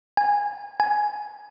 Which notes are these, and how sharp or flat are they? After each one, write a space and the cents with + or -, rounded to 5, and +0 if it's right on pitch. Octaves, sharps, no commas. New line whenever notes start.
G#5 -20
G#5 +10